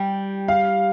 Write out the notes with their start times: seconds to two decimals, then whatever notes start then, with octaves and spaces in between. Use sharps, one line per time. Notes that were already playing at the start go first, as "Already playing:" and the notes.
Already playing: G3 G5
0.48 F5